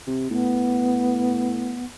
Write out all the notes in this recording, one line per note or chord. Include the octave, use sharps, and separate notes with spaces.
C3
A2 B3